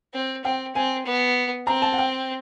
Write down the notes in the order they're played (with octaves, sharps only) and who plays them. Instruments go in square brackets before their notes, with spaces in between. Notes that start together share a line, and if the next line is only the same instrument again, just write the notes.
[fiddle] C4
[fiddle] C4 [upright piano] G5
[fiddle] C4 [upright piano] G#5
[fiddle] B3
[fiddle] C4 [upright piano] A#5
[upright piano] A5
F#5
G5